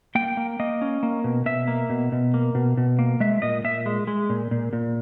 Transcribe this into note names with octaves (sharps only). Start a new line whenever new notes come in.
A#3 G5
A#3
A#3 D#5
C#4
A#3
B2
B2 E5
A#3
B2
B2
A#3
B2
B2
A#3
G#3 E5
A#2 D#5
A#2 E5
G#3
G#3
A#2
A#2
A#2